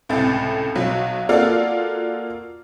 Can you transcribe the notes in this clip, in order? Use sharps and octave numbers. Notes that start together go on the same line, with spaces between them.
C#2 A2 C3 G5 A6
B1 F#3
A#3 F4 F#4 A4 D5 F5